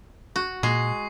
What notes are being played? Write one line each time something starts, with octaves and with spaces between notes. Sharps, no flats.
F#4
A#2 G#3 C#6 C7